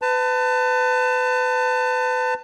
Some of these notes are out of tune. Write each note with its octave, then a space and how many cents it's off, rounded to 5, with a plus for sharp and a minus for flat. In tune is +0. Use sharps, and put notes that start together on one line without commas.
B4 +30 A5 +25